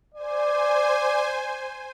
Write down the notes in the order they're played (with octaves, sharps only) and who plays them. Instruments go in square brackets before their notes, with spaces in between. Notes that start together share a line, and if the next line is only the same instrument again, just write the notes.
[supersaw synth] C5 G#5 [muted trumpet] D5